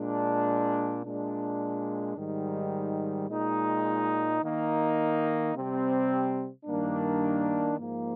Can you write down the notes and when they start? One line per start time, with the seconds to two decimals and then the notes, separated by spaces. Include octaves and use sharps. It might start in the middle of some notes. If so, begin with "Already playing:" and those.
Already playing: A#2 G#3 D4
1.03 A#2 G#3 D4
2.15 G#2 D#3 G3
3.27 A#2 G#3 D#4
4.40 D#3 A#3 D#4
5.53 C3 G3 C4
6.65 G2 D#3 A#3 D4
7.77 G#2 F3 A#3